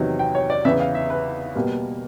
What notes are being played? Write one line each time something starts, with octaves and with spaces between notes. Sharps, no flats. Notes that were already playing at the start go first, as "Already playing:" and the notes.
Already playing: E2 C3 D#3 F#3
G5
C#5
D5
E2 C#3 E3 E5
F5
E5
B4
B2 G3 A#3